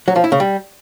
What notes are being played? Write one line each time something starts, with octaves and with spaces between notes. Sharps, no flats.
F#3
F3
E4
C#3
G3